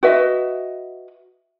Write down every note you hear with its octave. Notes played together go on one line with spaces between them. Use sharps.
F#4 B4 D#5 E5